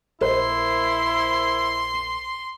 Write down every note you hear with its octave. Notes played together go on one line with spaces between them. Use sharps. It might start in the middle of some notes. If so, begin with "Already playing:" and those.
A#1 E4 A#4 C5 D#5 C6